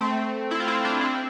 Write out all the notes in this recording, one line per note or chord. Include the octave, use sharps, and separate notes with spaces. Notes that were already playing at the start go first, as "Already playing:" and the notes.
A3 C4
C4 E4
F4
C4 E4
D4 F4
C4 E4